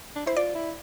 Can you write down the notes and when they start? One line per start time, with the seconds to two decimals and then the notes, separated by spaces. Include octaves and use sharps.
0.16 D4
0.26 E4 C5
0.36 F4 D5
0.55 E4